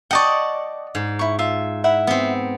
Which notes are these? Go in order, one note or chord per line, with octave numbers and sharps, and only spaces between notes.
D5 D#5 F#5 G5 A5 C#6
G#2
E4 C#6
F4 E5
E4 E5 F#5
B3 C4